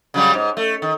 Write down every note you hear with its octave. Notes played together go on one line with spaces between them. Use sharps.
C#3 F#3 G3
G#2
A3
D#3